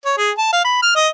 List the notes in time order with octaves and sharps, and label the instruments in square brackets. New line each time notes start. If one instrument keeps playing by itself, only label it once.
[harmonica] C#5
G#4
A5
F5
B5
F6
D#5